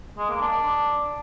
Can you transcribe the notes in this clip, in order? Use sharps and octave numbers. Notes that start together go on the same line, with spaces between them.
G#3
A#3
D4